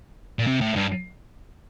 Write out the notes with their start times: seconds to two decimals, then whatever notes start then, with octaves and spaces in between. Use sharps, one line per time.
0.39 A#2
0.47 C3
0.61 A2
0.76 G2